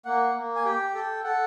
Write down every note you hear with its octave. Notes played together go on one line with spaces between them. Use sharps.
A#3 F#5
A#3
G#5
G4 G5
A4 G5
A4 F#5